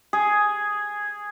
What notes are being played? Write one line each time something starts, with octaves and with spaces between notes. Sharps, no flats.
G#4